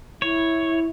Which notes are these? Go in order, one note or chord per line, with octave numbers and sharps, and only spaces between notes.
E4 C#5